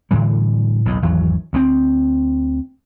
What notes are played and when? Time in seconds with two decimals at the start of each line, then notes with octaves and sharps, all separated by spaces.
0.11 A2 D3 E3 G3
0.85 B1 E2 A2
1.02 G#1 E2 E3 F#3
1.53 D2 G#3 C4